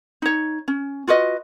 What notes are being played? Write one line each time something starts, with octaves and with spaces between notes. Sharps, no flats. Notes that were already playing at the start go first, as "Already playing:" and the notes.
D#4 C#5
C#4
F4 F#4 B4 D#5